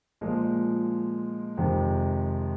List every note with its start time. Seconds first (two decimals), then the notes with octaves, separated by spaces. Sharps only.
0.21 A#2 F3 G#3
1.57 F2 C3 D#3 G#3